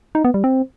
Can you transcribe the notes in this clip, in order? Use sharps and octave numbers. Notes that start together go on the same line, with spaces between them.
D#4
B3
G3
C4